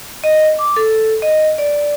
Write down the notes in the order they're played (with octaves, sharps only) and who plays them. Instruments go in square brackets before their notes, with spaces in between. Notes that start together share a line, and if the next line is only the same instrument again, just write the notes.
[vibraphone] D#5
D6
A4
D#5
D5